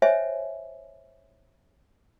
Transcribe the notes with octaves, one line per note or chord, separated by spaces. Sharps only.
C5 C#5 D#5 E5 G5 G#5